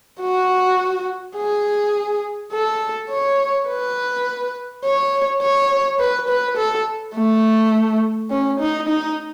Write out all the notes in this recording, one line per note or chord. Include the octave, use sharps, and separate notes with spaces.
F#4
G#4
A4
C#5
B4
C#5
C#5
B4
B4
A4
A3
C#4
D#4
D#4